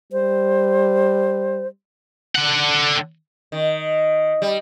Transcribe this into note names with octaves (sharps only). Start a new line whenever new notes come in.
G3 C5
D3 F#5
D#3
G3